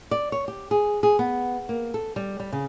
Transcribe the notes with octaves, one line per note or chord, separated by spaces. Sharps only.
D5
C#5
G4
G#4
G#4
B3
A#3
A4
G3
G3
C#3